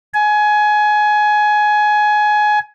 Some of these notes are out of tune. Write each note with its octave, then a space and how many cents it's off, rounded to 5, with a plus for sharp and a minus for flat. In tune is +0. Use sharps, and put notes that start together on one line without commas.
G#5 +20